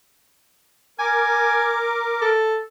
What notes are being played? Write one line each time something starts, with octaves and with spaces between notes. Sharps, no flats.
A#4 G#5 D6
A4